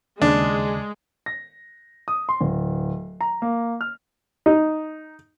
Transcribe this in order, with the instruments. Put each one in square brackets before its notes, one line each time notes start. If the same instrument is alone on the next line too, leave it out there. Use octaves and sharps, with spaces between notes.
[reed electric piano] D#2 C#3 [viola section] G#3 [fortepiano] D4
[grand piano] A#6
D#6
C6
D1
A#5
A#3
F6
[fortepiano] D#4